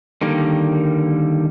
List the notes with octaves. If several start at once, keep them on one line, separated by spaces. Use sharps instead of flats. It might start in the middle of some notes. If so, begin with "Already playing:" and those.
D3 D#3 G3 A#3